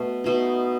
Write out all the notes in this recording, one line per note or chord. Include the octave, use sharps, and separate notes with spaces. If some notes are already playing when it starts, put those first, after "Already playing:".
Already playing: B2 A3
B2 A3 D#4